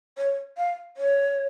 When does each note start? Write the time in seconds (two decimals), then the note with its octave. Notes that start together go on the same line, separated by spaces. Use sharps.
0.18 C#5
0.57 F5
0.97 C#5